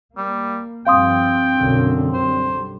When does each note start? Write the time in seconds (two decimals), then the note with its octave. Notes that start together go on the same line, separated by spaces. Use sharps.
0.17 G3 A#3
0.87 G2 F3 C4 F5 G5 C6 D#6
1.58 B1 F#2 D3
2.14 D3 G3 C5